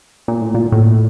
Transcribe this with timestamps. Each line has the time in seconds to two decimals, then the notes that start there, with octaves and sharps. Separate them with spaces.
0.28 A#2
0.41 A2
0.54 A#2
0.72 A2